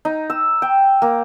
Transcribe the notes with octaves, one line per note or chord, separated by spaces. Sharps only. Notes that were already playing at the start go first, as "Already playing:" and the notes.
D#4
E6
G5
A#3